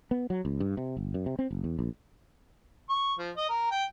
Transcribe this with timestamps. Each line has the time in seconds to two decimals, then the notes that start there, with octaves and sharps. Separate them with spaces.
0.11 B3
0.30 F#3
0.45 C#2
0.60 G2
0.77 C3
0.97 G1
1.14 F#2
1.26 C3
1.39 C4
1.51 F#1
1.64 E2
1.79 A#1
2.89 C#6
3.19 F3
3.37 D#5
3.49 A#4
3.71 G5